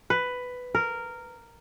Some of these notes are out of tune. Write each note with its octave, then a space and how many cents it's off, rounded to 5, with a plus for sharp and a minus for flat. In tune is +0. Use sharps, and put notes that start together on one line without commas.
B4 +10
A#4 -10